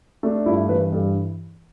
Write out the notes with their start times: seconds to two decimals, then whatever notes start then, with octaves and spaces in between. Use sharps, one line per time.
0.23 A3 D4
0.35 D4
0.46 G2 E4
0.69 E3 B4
0.92 G2 A4